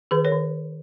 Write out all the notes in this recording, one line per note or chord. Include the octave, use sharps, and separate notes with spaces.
D#3 G#4 B4
A#4 C#5
D#3